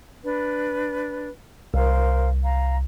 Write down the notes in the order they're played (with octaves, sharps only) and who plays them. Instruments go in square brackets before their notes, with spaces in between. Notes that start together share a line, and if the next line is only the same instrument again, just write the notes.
[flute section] D4 B4
[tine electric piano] C2 [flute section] A#4 C5 F5
[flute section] F5 A#5